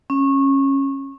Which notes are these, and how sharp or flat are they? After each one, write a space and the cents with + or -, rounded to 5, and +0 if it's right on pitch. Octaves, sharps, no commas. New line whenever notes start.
C#4 -20